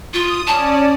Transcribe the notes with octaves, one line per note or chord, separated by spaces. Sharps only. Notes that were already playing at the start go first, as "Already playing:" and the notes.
F4 D#6
C#4 D5 A5